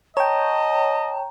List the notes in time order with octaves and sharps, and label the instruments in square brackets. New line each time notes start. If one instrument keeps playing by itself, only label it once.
[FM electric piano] C#5 G5 [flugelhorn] D#5 [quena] A5 [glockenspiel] A#5